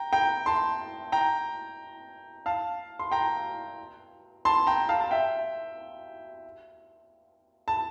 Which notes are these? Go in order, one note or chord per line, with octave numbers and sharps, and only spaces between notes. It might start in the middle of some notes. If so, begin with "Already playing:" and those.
Already playing: G5 A#5
G5 A#5
A5 C6
G5 A#5
F5 A5
C6
G5 A#5
A5 C6
G5 A#5
F5 A5
A5
E5 G5
A5